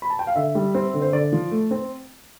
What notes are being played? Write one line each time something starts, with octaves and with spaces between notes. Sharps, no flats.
B5
A5
G5
F5
D3 E5
G3
C4
D3
C5
D3 D5
F3
A3
C4